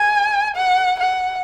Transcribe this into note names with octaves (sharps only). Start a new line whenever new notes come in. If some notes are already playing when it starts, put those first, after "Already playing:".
Already playing: G#5
F#5
F#5